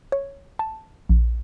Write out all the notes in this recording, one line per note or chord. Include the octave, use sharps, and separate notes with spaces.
C#5
A5
A#1